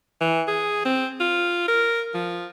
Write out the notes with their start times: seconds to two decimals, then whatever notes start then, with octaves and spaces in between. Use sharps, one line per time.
0.21 E3
0.48 G#4
0.85 C4
1.20 F4
1.68 A#4
2.14 F3